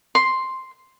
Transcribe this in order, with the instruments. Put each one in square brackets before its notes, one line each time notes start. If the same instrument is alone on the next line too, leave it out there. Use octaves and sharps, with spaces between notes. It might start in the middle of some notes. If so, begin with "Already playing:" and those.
[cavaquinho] C6